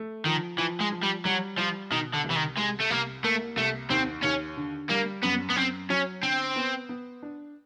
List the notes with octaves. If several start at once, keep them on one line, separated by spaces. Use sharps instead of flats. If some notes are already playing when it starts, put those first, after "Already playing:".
Already playing: A3
D#3 F3
E3 F3
G#3
F3
G3
F#3 G3
F3 G3
B2 D#3
D3
C2
E3
D#3
C2 G#3
A3
C2 A#3
A3 A#3
C2 A3
D#2 C4
D#2 C#4
D3
G3 A#3
F#2 B3
B3
F#2 C4
F#3 C#4
D3 C4
B3
B3
D4